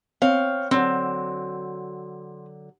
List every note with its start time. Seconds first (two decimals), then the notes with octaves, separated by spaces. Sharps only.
0.22 C4 C#5 F5 G5
0.71 D3 F#3 C4